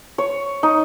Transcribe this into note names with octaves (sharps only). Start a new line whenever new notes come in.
C#5
D#4